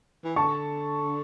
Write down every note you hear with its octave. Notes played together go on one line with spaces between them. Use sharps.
E3
D3 A5 C#6